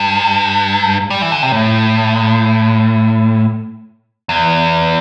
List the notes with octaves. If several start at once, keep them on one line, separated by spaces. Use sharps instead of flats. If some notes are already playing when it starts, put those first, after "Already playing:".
Already playing: G2
G3
E3
D3
C3
A2
E2